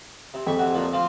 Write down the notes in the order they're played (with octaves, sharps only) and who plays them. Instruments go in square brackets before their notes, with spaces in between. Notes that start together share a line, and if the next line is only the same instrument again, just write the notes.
[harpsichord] C3
[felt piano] F2 [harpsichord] B5 C#6
[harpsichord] C3 F#4
A#2 F3
F3 C4 F4